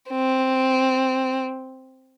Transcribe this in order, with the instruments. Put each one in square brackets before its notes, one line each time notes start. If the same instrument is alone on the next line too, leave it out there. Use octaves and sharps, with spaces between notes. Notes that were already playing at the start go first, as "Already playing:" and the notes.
[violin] C4